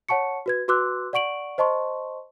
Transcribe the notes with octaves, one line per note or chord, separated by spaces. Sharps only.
C#5 F#5 A5 C#6 C#7
F#4 B4 G#6
F#4 B4 C6 D6 E6 F#6
D5 F#5 C#6 D7 F#7
C5 D#5 A5 C6 C#6